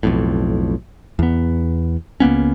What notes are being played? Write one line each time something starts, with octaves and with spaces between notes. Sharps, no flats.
B1 F2 A2
E2 B3
C#2 A#3 B3 C#4